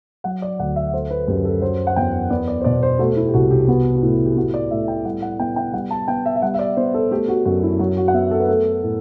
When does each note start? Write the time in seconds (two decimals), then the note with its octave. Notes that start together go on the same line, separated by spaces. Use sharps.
0.24 F#3 F#5
0.42 D5
0.59 D2 F#5
0.76 E5
0.93 A3 C5
1.11 B4
1.28 F#2 G4
1.45 A4
1.62 F#3 C5
1.87 F#5
1.96 E2 G5
2.30 B3 D5
2.48 D5
2.61 C5
2.64 B2 D5
2.83 C5
2.99 A3 F#4
3.16 E4
3.28 G4
3.34 C2 F#4
3.51 G4
3.68 B3 F#4
3.95 F#4
4.02 A2 E4
4.25 G4
4.36 B3 F#4
4.54 D5
4.71 A2 E5
4.88 G5
5.05 G3 F#5
5.22 F#5
5.39 B3 G5
5.56 G5
5.74 G3 F#5
5.91 A5
6.08 B3 G5
6.26 E5
6.36 E5
6.42 G3 F#5
6.54 E5
6.59 D5
6.77 B3 C5
6.94 A4
7.11 A3 G4
7.28 F#4
7.45 F#2 F#4
7.63 E4
7.79 F#3 F#4
7.97 F#4
8.08 F#5
8.14 B3 E5
8.31 A4
8.40 B4
8.48 A3 A4
8.83 A2